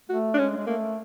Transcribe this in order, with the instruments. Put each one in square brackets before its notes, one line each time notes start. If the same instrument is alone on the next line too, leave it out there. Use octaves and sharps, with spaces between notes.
[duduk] A3 [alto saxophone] F#4
[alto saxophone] D4
[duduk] G#3 [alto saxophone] C#4
[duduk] G#3
[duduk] A3 [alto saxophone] A#3